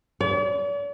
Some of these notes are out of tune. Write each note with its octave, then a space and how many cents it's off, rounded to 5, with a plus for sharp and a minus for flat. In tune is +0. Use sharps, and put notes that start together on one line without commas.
D5 -45